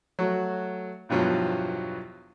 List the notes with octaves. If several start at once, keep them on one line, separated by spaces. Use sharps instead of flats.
F#3 A3 F#4
E2 G2 B2 F3 F#3